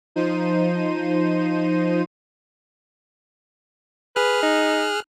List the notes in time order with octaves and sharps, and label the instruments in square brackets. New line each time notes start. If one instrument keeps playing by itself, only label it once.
[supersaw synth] F3 D#4 C5 D#7
[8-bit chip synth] G#4 F6 F#6 [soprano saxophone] B4
[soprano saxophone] D#4